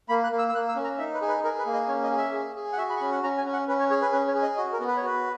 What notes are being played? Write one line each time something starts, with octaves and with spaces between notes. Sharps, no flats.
A#3 B5
F#6
A#3
E6
E6
A#3 F#6
E6
C#4
A#5
D#4 E5
B4
G#4
B4
G#4 A#4
B4
A#3
D#5
C#4 C#5
D#5
G#4
E5
G#4
G#4
F#5
F#4 E5
B5
C#6
C#4 B5
F#5
C#4 A#5
G#5
C#4
F#5
C#4 B4
C#5
G#4 C#5
B4
C#4 B4
C#5
G#4
D#5
F#4 D#5
A#4
B3
B4
C#5
F#4 B4